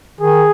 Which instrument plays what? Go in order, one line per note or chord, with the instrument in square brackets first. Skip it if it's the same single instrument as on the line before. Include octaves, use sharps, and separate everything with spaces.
[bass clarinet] D#3 [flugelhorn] G#4